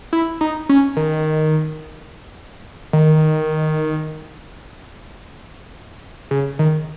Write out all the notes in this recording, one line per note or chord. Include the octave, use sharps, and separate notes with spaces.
E4
D#4
C#4
D#3
D#3
C#3
D#3